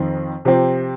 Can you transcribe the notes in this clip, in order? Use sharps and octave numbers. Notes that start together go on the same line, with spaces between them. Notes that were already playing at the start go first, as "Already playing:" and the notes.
Already playing: F2 D#3 C4
C3 F3 C4 G4